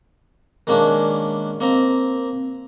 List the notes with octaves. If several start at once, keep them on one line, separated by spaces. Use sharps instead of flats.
D#3 G#3 A#3 C#4 D4
A#3 C4 A#5